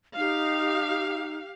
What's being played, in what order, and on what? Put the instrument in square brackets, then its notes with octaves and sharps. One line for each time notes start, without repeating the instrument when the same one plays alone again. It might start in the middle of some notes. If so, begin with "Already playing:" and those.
[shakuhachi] D#4 [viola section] G4 F5